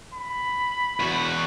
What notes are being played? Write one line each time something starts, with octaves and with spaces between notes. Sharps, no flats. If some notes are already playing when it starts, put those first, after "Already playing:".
B5
E2 F#4